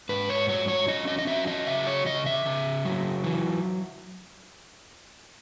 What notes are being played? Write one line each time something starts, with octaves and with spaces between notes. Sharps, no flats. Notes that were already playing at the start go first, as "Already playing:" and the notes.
G#2 B4
C#5
F#3 C#5
C#5
C#4 D#5
D#5
D#5
F#3 E5
D#5
C#3 E5
C#5
C#3 D#5
E5
C#3
F#3
E3